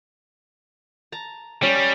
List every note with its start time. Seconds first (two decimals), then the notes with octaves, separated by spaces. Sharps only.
1.12 A5 A#5
1.63 G3 C#4 G4